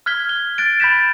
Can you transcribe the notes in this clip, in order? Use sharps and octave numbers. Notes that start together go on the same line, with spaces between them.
F6 F#6 G#6 B6 G7
G7
F#6 A6 D7
B5 G6 A6 B6 E7